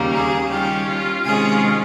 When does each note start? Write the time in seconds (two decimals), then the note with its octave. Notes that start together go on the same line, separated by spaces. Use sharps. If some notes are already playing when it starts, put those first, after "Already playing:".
Already playing: D#2 C#3 G3 A#3
0.13 G#4
0.49 D#3 G3 C#4 F4 G4
0.86 F4
1.23 C3 D#3 G#3 C#4 F4 G#4